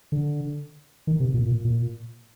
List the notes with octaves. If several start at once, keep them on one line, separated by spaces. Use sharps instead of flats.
D3
D#3
C3
A#2
A#2
A#2